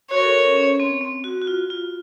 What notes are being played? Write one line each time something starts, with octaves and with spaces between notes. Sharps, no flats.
F#4 C#5
A#4
A4
A#4
C#4
C#4
C4
C4
F#4
F#4
F4
F4